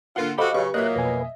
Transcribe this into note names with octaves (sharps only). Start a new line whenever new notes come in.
D3 A#3 F4 F#5
F#4 G4 A4 C5 D#5 F5 B5
C#3 F#3 G4 B4 C#6
A#2 F#3 A#3 D#5 E5 F#6
F2 B2 B4 G#5